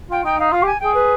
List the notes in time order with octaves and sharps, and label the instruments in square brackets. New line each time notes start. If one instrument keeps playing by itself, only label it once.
[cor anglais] F4 [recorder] G5
[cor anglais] D#4 [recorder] G5
[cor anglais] D#4 [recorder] F5
[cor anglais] F4 [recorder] F5
[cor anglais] G4
[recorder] G#5
[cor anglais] G#4 [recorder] G5
[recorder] B4